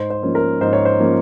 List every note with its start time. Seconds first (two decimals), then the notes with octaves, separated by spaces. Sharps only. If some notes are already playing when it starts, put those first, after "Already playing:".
Already playing: G#2 C5
0.10 C5
0.23 F3 A#3 C#4
0.35 A#4
0.61 G#2 C5
0.73 C#5
0.85 C5
1.00 F3 A#3 C#4